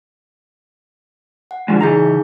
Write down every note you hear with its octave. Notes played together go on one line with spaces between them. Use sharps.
F#5
D3 F3 G#3
C#3 E3 D#4 G#4 A#5 G6